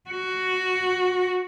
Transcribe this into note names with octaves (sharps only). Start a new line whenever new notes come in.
F#4